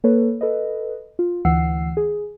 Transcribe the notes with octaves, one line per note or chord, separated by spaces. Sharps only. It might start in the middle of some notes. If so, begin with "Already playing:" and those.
A#3 A4 B4 C#5
A4 B4 D#5
F4
D2 E3 F#5 E6 C7
G#4